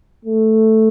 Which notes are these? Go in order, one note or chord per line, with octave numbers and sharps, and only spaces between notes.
A3